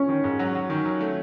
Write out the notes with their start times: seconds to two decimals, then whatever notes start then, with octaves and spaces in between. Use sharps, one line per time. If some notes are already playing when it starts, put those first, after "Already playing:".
Already playing: C#4
0.09 D#3
0.24 G#2
0.39 F#3
0.55 F#3
0.70 D#3
0.85 F#3
1.00 A3